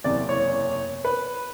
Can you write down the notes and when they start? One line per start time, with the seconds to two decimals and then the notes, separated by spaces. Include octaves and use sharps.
0.04 F#1 E2 C3 D5
0.29 C#5
1.05 B4